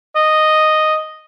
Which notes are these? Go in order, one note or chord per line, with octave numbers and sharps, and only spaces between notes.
D#5